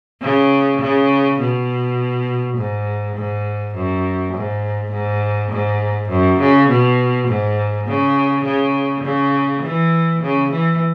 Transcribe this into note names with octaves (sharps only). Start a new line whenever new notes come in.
C#3
C#3
B2
G#2
G#2
F#2
G#2
G#2
G#2
F#2
C#3
B2
G#2
C#3
C#3
C#3
E3
C#3
E3